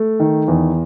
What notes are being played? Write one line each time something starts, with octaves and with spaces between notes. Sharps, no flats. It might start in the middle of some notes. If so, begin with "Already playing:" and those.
Already playing: A3
D#3
E2